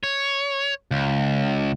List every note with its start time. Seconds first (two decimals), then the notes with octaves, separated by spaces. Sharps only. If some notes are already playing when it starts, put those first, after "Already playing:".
0.03 C#5
0.91 C#2